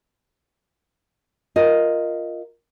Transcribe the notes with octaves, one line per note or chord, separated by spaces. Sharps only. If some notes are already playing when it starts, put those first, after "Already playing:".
F4 A#4 D#5